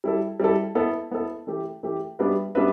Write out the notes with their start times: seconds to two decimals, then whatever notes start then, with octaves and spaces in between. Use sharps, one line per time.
0.04 G3 E4 A4
0.40 G3 E4 A4
0.75 B3 E4 A4
1.11 B3 E4 A4
1.47 E3 A3 E4 G4
1.83 E3 A3 E4 G4
2.19 G3 B3 D4 B4 E5
2.55 G3 B3 D4 B4 E5